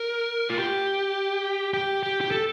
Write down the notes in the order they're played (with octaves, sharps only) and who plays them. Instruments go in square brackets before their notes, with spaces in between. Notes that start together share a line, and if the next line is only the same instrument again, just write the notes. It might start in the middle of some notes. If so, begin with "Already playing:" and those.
Already playing: [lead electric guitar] A#4
F4
G4
G4
G4
G4
A4